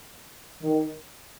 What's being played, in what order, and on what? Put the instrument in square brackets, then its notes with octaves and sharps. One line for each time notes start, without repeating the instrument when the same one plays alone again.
[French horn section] D#3